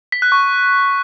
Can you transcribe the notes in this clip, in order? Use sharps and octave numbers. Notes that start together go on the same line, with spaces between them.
B6
F#6
C#6